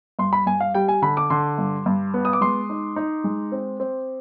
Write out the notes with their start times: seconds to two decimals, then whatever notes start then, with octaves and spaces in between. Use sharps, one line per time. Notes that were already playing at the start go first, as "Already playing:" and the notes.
0.19 G2 C6
0.33 B5
0.46 G2 G#5
0.61 F5
0.74 G3 G5
0.88 G#5
1.02 D3 B5
1.17 D6
1.30 D3 C6
1.58 G2
1.86 G2
2.14 B3
2.25 D#6
2.33 D6
2.41 G#3 C6
2.70 D#4
2.96 D#4
3.24 G#3
3.52 C4
3.80 C4